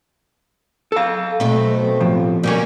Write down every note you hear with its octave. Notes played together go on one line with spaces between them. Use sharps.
A4 F5
B1 B2 A3 C4
A2 F3
B2 G3 A#3 C#4